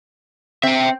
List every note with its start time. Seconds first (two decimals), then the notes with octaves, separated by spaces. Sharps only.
0.63 C4 E5 G5